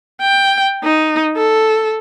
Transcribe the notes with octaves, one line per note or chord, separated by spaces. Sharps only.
G5
D#4
A4